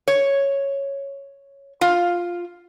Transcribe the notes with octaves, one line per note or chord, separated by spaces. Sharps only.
C#5
F4